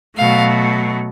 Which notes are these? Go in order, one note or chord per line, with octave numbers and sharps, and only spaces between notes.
B2 F#3 A3 F5